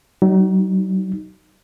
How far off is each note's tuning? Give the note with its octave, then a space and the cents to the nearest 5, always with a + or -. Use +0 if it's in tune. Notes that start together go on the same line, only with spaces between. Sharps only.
F#3 +40 D#4 -5